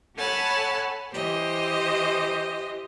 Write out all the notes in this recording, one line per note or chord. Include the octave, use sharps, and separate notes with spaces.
A4 C#5 F#5 G#5 A5 B5
E3 G4 C5 D#5